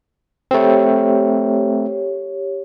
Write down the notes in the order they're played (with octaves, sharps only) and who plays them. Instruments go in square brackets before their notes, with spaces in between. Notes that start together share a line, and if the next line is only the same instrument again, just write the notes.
[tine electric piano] A3 C4 [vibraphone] G4 C#5